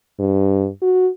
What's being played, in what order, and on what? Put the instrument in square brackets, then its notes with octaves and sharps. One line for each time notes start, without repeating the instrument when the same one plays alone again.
[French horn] G2
F#4